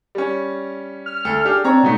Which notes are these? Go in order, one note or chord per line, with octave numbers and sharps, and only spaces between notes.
G3 C#4
F6
D2 A4
D4 G4 G#4
C4 D4 C#5 A#5
B2 A3 D#4 F#4